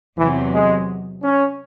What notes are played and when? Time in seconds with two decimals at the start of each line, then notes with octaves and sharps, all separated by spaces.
0.18 E2 C3 E3 F#3
0.54 G#3
1.23 C#4